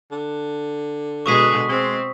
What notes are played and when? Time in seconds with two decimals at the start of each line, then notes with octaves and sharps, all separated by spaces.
0.11 D3
1.26 B2 G#3 G#4 C#6 D#6 B6
1.69 G#3 C4